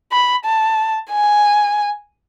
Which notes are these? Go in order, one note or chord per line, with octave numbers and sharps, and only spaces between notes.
B5
A5
G#5